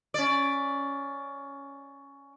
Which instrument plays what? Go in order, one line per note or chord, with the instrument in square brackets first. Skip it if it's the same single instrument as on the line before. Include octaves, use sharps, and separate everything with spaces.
[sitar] C#4 D5